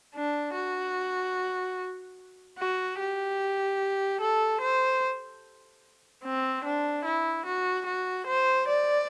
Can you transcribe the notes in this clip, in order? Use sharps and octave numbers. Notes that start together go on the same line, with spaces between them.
D4
F#4
F#4
G4
A4
C5
C4
D4
E4
F#4
F#4
C5
D5